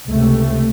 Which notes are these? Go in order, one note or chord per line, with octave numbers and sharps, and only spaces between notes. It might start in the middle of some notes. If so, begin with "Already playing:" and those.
C#2 C3 A3